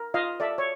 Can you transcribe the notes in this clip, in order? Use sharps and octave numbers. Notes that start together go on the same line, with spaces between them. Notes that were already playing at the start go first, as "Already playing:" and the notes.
Already playing: A#4
F4 D#5 F5
A4 D5 E5
C#5